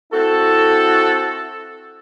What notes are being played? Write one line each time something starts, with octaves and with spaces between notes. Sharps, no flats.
C4 E4 F#4 A4